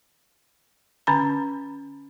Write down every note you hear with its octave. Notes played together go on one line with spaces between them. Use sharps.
D3 C#4 G#5 A#5